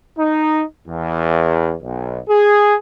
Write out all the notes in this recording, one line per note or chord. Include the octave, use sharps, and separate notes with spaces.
D#4
E2
B1
G#4